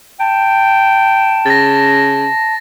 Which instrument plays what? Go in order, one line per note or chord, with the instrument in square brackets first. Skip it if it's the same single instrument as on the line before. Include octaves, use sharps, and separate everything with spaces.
[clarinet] G5 [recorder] A5
[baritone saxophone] C#3 [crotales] A6 A#6